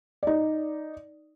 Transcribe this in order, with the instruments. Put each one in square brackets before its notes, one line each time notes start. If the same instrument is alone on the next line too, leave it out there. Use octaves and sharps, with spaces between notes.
[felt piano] D#4 D5